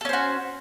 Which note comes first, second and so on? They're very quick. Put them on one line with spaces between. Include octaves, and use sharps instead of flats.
A4 C#4 C5 F#4